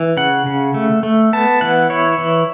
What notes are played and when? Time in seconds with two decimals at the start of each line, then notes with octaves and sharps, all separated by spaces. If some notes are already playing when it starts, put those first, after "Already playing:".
Already playing: E3
0.17 C#3 F#5
0.46 C#3
0.74 A3
1.03 A3
1.33 B3 A5
1.61 E3 F#5
1.90 E4 C#5
2.18 E3